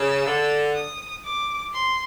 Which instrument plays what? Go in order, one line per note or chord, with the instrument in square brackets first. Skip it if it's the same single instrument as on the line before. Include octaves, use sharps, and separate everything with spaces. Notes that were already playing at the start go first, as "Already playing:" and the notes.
Already playing: [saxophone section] C#3 [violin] E6
[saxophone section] D3
[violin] D#6
D6
C6